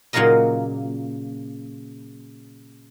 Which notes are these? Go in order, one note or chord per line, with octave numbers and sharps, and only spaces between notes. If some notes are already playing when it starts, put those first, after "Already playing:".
A#2 C#3 F#3 F4 A#4 D#5